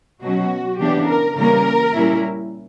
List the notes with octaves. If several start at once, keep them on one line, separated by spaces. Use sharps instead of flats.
B2 F#3 C#4 F#4
C#3 E3 B3 D4 G4
A#4
C#3 E3 G3 A#3 C#4 A#4
A#2 G3 C#4 E4